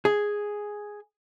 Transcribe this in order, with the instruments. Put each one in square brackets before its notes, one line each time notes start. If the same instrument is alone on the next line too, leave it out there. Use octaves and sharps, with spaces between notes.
[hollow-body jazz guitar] G#4